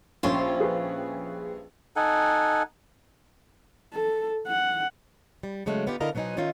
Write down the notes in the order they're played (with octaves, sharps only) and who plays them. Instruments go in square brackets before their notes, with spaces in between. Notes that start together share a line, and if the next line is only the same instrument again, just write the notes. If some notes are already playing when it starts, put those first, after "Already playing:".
[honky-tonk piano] A#1 C#4 [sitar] G2 C5 [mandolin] F4 C#5 C6
[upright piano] G#4 B4
[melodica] D#4 A4 F#5 G#5
[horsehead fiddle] A4
F#5
[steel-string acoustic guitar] G3
C#3 F#3 G#3 A3
D3 B3 D#4 F4 G4
D3 E4 A#4 D#5 F5 A#5
B2 F#3 B3 D#4 C5 G#5
D#3 C#4 D#4 F4 E5